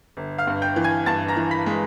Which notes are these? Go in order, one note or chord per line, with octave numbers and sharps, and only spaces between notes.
G1
F5 F6
G2
G5 G6
E3
G#5 G#6
G2 A5 A6
A#5 A#6
E3
B5 B6
G#3